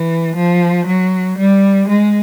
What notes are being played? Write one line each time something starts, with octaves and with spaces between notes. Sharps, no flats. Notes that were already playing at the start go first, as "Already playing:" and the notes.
Already playing: E3
F3
F#3
G3
G#3